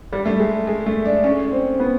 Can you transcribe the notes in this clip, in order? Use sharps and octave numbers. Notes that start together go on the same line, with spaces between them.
G3
A3
G#3
G#3
A3
D4
C#4
C4
B3